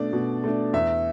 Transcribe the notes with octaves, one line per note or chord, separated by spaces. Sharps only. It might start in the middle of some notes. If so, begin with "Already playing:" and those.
Already playing: B2 A3 D4 D5
B2
A3 D4
E2 E5